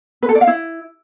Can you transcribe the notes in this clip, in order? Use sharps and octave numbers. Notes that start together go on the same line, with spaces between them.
B4
A4
D5
F5
E4